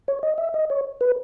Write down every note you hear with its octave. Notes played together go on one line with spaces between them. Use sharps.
C#5
D#5
E5
D#5
C#5
B4